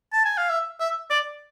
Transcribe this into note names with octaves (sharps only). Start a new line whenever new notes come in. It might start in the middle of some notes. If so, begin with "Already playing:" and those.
A5
G#5
F5
E5
E5
D5